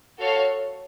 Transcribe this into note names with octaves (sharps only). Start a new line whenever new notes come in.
F#4 A4 C#5 F5